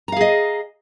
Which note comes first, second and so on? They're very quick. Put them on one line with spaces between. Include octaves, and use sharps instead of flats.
A#5 F5 G#4 D#5